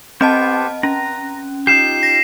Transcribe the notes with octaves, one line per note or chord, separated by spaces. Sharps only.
B3 C4 G4 C5 D#5 A5
C#4 A#5
D#4 F4 G4 C7 E7
A#6